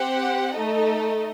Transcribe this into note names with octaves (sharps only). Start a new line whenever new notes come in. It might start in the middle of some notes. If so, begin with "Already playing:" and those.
Already playing: C4 G4 C5 F#5
A3 D#4 A4 D#5